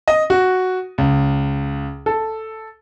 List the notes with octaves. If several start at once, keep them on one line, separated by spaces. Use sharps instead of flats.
D#5
F#4
C#2
A4